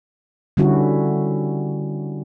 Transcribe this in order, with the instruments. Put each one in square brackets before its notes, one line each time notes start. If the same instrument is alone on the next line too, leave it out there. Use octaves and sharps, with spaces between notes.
[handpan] D3 G3 C#4 E4 F#4